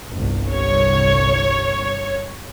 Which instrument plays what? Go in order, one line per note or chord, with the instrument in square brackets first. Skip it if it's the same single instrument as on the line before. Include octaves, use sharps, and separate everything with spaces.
[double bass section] G1 C2
[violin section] C#5